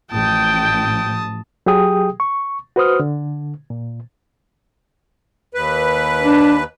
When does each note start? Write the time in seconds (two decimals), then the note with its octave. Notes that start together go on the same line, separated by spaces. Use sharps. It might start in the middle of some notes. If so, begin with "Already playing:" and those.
0.12 A1 F3 G5 A5 D#6
1.66 F#3 G4 G#4 G5 D#6
2.20 C#6
2.76 F#4 B4 C5 D#6 F6
3.00 D3
3.70 A#2
5.54 D#2 B4
6.23 D4